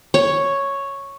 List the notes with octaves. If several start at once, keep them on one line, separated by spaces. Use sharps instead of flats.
C#5